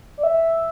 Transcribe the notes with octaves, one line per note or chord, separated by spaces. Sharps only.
D5
E5